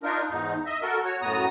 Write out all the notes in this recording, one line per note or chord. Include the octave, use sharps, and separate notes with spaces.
D4 D#4 F4 A#4
E2 G#2 D#4
D#5 E5
F#4 A4 A#4
F#4 C#5
F#2 A2 B3 F#4 A#5 D#6